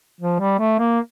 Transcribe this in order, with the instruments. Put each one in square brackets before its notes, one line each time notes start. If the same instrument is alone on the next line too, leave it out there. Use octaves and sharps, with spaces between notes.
[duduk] F3
G3
A3
A#3